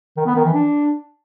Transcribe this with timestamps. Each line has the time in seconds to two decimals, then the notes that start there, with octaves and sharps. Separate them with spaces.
0.17 D#3
0.26 B3
0.36 D#3
0.45 E3
0.54 D4